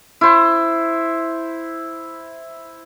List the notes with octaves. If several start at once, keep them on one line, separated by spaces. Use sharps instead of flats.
E4 C5